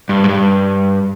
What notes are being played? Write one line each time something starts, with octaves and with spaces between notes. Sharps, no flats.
G2
G#2
G2